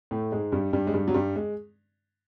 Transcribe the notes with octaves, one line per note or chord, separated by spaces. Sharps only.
A2 A3
G#2 G#3
G2 G3
G2 G3
G#3
G2 G3
F#3
G2 G3
G#3